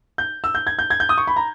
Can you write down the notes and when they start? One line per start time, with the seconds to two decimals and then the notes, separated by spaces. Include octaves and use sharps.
0.18 G6
0.44 E6
0.55 G6
0.67 G#6
0.79 G6
0.90 G#6
1.00 G6
1.09 D#6
1.18 C#6
1.27 B5
1.36 A#5